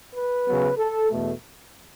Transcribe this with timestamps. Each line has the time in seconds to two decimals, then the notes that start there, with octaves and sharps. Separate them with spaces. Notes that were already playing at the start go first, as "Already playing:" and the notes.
0.15 B4
0.47 C#3 F#3 B3
0.78 A4
1.11 E2 B2 A3